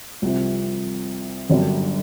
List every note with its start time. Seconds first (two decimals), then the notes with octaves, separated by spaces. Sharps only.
0.22 C2 C3 F3
1.50 G1 F#2 D3 G3